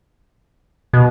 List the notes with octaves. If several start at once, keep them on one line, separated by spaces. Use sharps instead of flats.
B2